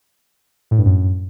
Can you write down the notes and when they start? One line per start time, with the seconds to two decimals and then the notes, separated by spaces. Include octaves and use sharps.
0.71 A2
0.78 G2
0.85 F#2